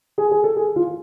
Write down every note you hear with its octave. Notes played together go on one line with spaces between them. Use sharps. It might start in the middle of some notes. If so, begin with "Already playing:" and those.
G#4
G#4
A4
G#4
F4